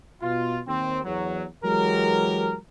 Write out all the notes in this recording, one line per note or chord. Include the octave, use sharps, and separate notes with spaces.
B2 F4
D#2 C4
E2 F#3
E3 F#3 G#3 G4 A#4